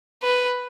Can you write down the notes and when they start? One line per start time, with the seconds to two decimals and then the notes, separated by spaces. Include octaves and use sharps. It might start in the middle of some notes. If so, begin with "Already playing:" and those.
0.23 B4